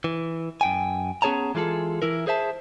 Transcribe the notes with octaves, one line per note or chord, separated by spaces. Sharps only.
E3
F#2 G5 G#5
B3 C#4 G#4 C#5 A5 A#5
E3 G#3 F4 G#4 A4
E3 E4 A#4
G#4 C5 E5 A5